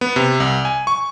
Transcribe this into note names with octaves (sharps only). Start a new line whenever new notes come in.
B3
C3
C2
G#5
C#6